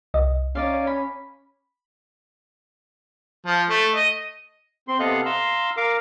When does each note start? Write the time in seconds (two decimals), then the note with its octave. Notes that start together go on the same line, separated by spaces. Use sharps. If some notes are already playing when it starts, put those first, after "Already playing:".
0.14 C2 D#5
0.55 C#4 D#4 D5 F5
0.87 B5
3.46 F3
3.70 A3
3.95 D#5
4.88 C4 C6
4.99 C3 B3 A4 D#5 F5 F#6
5.26 F5 A#5 C6 E6
5.77 A#4 F5 D6